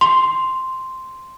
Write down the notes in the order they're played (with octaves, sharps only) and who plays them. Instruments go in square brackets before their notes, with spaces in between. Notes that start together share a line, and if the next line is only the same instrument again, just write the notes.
[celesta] C6